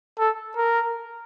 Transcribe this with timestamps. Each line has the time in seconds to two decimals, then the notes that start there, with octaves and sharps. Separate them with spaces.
0.19 A4
0.57 A#4